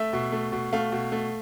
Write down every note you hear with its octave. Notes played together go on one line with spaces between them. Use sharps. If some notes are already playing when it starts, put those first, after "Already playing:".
Already playing: A3 E5
B2
A3
B2
A3 F5
B2
A3